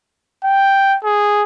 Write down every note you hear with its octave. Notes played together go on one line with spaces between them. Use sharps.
G5
G#4